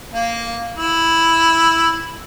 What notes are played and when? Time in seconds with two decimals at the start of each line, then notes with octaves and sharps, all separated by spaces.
0.14 A#3
0.77 E4